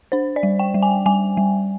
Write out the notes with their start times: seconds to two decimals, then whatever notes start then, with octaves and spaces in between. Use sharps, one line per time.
0.12 D4 C5
0.36 D5
0.43 G3
0.59 G5
0.74 G3
0.83 G#5
1.06 G3 G#5
1.37 G3